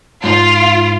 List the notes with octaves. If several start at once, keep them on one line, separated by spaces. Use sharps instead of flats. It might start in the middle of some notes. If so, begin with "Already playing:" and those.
G#2 F4